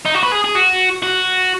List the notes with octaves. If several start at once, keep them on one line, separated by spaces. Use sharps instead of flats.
D#4
F#4
B4
G#4
G#4
F#4
F#4